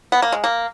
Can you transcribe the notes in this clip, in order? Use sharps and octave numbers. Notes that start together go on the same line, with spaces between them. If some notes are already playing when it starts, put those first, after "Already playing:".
B3
A#3
G#3
A#3